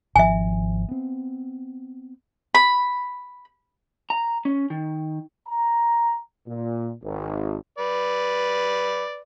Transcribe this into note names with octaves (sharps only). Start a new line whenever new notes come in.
G#1 F3 E5 G#5
B3 C4
B5
A#5
C#4
D#3
A#5
A#2
G#1
B4 D5